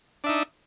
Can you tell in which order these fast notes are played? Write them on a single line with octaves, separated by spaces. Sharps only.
D4 E5 D#4